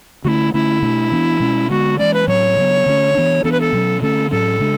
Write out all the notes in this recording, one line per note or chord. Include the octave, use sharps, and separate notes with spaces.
D3 A3 C#4 E4 F#4
D3 A3 C#4 E4
B2 A3 D4
E3 B3 D4
B2 G#3 C#4
D3 G#3 B3 F#4
E3 G#3 C#4 D5
B4
A2 F#3 C#4 C#5
C#3 F#3 B3
D3 A3 C#4
E3 B3 D4
E3 B3 D4 A4
B4
A4
B2 F#3 C#4
D3 A3 C#4 A4
A2 F#3 C#4 A4
C#3 G#3 D4